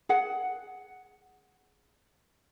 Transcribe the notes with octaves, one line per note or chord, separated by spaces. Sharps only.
G#4 F#5